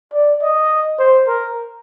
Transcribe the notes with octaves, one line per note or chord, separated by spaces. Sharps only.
D5
D#5
C5
A#4